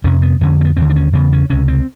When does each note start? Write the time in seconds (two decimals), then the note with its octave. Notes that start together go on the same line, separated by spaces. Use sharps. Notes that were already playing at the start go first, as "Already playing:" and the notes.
0.04 F2 C3 C#4
0.22 B3
0.41 F2 D3 C#4
0.61 C4
0.65 B3
0.77 D#2 D3 C4
0.90 D4
0.96 C#4
1.13 E2 C#3 B3
1.32 C#4
1.50 C#2 C3 C#4
1.68 C4